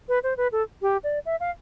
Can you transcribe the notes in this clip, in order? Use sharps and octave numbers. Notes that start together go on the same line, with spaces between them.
B4
C5
B4
A4
G4
D5
E5
F5